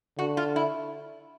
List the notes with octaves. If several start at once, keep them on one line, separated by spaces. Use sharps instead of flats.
D3 F#4
F4
E4